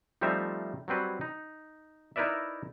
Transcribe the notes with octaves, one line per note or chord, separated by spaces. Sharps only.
F3 G3 A3 C4 D#4 E5
F#3 G3 C4 B4 C#5
D#4
D#4 E4 A#4 B4 D5 E5